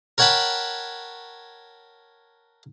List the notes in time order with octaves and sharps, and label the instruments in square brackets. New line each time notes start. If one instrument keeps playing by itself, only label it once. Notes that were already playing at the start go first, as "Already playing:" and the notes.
[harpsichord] A#4 C#5 F#5 G5 A5 B5